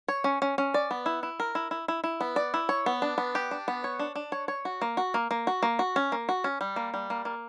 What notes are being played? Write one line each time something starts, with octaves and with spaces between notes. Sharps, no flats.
C#5
C#4
C#4
C#4
D5
B3
E4
E4
A#4
E4
E4
E4
E4
B3
D5
E4
C#5
B3
D4
B3
G4
D4
B3
C#5
D4
D4
C#5
C#5
F#4
A#3
F#4
A#3
A#3
F#4
A#3
F#4
C#4
A#3
F#4
C#4
G3
A#3
G3
A#3
A#3